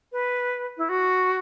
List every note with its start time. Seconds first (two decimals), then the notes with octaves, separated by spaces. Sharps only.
0.12 B4
0.78 E4
0.89 F#4